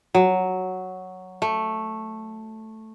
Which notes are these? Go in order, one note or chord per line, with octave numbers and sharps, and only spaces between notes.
F#3
A3